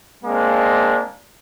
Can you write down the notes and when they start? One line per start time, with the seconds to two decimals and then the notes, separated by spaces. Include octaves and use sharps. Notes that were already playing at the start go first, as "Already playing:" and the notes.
0.24 G#3 A#3 C4 D4